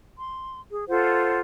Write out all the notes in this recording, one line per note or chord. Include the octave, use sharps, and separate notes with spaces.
C6
G#4
F4 A4 C5 F#5